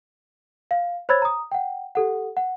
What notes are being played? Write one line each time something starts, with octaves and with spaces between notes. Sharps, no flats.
F5
C5 C#5 B5 E6 G#6 A6
A#5 D#6
F#5 G5
G4 A4 F#5
F#5